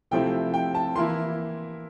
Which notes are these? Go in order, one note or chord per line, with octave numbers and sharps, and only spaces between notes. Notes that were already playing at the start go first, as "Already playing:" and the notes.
C3 F3 A3 C4 E4 G5
G5
A5
E3 A#3 E4 C6